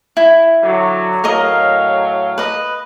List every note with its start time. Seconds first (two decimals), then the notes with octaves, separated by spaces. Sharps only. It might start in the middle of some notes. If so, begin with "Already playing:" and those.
0.17 E4
0.63 D3 F#3
1.24 A2 F#3 A#4 D#5 F5 A#5
2.38 B4 D#5